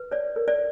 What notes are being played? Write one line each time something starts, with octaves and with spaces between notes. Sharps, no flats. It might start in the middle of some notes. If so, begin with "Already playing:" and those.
Already playing: B4
C#5 D5
A#4
D5